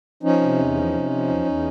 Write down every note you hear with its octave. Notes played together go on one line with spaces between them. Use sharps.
F3 C#4 D#4
C3
E2
F3
C3
F3
E2
E2